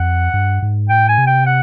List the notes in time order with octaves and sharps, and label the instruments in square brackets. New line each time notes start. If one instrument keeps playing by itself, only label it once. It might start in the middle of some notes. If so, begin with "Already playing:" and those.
Already playing: [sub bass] F2 [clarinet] F#5
[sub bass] G2
G#2
[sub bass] A2 [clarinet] G5
[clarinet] G#5
[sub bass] C3
[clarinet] G5
F#5